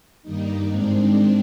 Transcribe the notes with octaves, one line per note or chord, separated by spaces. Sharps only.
G2 D#3 G3 A#3 D#4
G#2 D#3 G#3 C4 D4